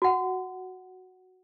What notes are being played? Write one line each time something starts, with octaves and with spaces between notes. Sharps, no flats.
F#4 F#5